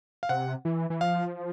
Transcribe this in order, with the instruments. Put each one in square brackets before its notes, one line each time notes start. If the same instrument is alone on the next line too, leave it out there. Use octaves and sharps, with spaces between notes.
[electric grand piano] F5
[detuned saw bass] C3 [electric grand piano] F#5
[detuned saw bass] E3
E3
[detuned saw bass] F3 [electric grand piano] F5